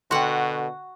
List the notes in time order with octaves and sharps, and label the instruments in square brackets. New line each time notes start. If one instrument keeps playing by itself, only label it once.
[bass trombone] B2 [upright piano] D3 [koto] F#4 F#5 [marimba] G5 C6